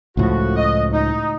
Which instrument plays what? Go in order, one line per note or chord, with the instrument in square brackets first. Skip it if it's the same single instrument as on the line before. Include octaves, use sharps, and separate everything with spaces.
[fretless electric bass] C#2 A2 F3 [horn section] F#4
[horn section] D#5
D#4